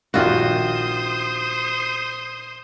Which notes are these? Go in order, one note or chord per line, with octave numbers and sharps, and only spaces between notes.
A#1 D#3 G3 F4 F#4 C5 D#6